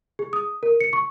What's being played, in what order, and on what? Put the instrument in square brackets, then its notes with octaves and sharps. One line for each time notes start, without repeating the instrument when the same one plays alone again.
[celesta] G#4
D#6
A#4
C#7
C#6